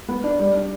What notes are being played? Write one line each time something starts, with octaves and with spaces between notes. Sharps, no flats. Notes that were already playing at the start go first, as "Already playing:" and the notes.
B3
D4
G3
D4